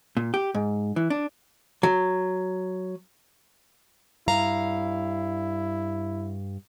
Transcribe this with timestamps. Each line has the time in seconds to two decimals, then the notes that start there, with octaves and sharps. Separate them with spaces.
0.17 A#2
0.34 G4
0.54 G#2
0.96 E3
1.10 D4
1.83 F#3
4.28 G2 E4 F5 A#5